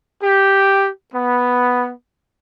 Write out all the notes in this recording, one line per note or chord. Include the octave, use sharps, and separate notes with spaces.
G4
B3